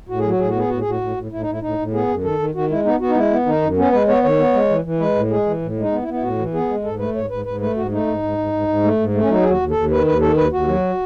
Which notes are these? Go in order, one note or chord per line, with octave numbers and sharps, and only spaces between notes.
A2 F#4
G#4
F#3 F#4
A2 G#4
F#4
B3 G#4
A2 F#4
G#4
A2 F#4
A2
A2
A2 E4
D#4
A2 E4
A2 D#4
A2
B3 G#4
F#2
D#3 A4
D#3
D#3 F#4
G#3 E4
B3 D#4
B3 F#4
D#4
G#3 E4
B3
D#3 D#4
F#2
B3 C#4
G#3 B4
B3 C#5
D#3 C#5
B3
G#3
E3
E3
G#3 B4
A2
G#3 G#4
E3
A2
G#3
D#4
B3
E4
B3
E4
A2 F#4
E3
B3 G#4
G#3
G#2 A4
A3 B4
G#2 C#5
G#2 B4
G#2 B4
A3 B4
G#2 F#4
A3 D#4
G#2
G#2
G#2
G#2
G#2
A3
G#2
A3
C#4
F#3 D#4
D#2 G#4
F#4
D#2
A4
D#2
D#3 B4
D#2 B4
D#3 A4
D#2 B4
D#2 F#4
F#3